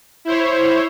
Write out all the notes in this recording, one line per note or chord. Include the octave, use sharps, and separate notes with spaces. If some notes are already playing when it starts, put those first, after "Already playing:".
E4 C5 C#5